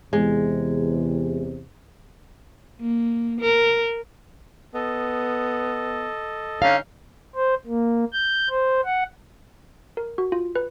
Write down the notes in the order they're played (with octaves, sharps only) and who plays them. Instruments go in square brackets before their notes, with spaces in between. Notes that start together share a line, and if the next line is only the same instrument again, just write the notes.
[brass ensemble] E2 C3 [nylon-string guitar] G#3
[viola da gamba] A#3
A#4
[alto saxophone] B3 [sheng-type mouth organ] A4 D#5
[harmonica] D3 C#4 D#4 [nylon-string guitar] F5
[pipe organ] C5
A#3
G6
C5
F#5
[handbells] A#4
F#4
F4
B4